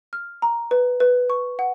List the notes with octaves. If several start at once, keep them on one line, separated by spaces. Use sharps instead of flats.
F6
A#5
B4
B4
C#6
F#5